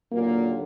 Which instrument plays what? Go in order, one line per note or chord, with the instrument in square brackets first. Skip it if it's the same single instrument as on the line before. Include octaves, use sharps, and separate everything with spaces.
[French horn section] D#2 A#2 D3 F#3 A#3